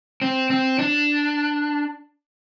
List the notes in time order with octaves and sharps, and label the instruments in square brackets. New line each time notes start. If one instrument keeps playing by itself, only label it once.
[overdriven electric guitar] C4
C4
D4